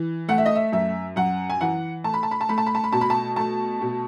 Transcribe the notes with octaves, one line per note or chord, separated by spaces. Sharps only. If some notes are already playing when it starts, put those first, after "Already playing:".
Already playing: E3
A3 F#5
E5
D#5
E5
F#2 E5
F#2 F#5
G#5
E3 F#5
A3 A5
B5
A5
B5
A5
A3 B5
A5
B5
A5
B5
B2 A5
B5
A5
A3 A5
B2